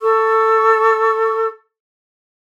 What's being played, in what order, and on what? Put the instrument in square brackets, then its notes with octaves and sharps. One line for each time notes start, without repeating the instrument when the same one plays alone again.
[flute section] A4 C#6 E6